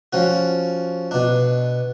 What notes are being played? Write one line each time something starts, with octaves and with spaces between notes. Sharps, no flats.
F3 C#4 F#4
B2 D4